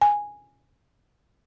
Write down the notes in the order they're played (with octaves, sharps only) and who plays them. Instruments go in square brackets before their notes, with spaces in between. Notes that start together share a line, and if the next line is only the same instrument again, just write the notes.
[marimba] G#5